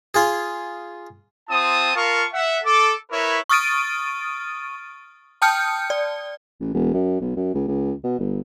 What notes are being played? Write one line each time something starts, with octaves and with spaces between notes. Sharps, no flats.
F4 G#4
C4 F4 A5 D#6
F4 A#4 F5 A5 C#6
E5 F#5
A4 D6
E4 A#4 B4 C#5
C#6 D#6 F6 A6 D7 D#7
G5 A5 D#6 F6 G6 C#7
D5
A1
E1
F#2
B1
F#2
C#2
C#2
B2
G1